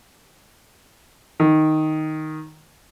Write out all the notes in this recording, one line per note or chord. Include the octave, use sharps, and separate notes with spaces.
D#3